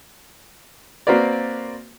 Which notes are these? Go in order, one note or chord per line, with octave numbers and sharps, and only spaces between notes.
A#3 C4 F#4 A#4 B4 D5